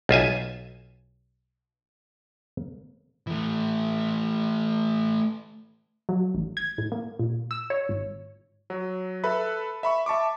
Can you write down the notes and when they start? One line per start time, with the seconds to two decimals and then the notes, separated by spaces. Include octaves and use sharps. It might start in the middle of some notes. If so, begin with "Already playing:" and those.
0.09 B1 F4 E5 G#5
3.27 E3 A3
6.09 F#3
6.35 A1
6.57 G#6
6.78 A2
6.92 A#3
7.19 A#2
7.51 E6
7.70 C#5
7.89 G#1
8.70 F#3
9.24 A4 B4 E5 B5
9.83 E5 B5 C#6
10.06 E5 A5 C#6 D6